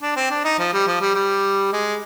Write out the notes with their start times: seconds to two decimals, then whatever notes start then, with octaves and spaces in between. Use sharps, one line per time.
0.01 D4
0.16 C4
0.31 D4
0.45 D#4
0.59 F3
0.73 G3
0.87 F3
1.01 G3
1.15 G3
1.73 G#3